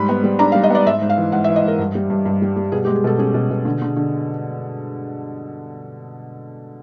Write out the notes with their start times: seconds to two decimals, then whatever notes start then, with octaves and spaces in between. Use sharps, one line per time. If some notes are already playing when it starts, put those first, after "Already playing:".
Already playing: G#2 G3 B5
0.09 B3
0.24 G3
0.39 D4 A#5
0.52 F5
0.55 G3
0.63 D#5
0.70 B3 D5
0.86 G#2 E5
1.02 G#2
1.10 F5
1.18 E3
1.32 G#2 F#5
1.44 E5
1.49 E3
1.56 D#5
1.63 G#2 A#4
1.79 G2
1.95 G3
2.10 G2
2.25 G2
2.42 G3
2.56 G3
2.72 B2 G#4
2.85 G4
2.87 G#3
2.95 G#4
3.04 B2 A4
3.18 C#4 G#4
3.34 B2
3.50 B2
3.65 D3
3.82 D3
3.97 D3